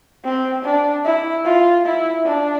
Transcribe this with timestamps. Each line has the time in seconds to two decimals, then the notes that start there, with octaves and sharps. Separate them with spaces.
0.24 C4
0.65 D4
1.05 E4
1.46 F4
1.86 E4
2.25 D4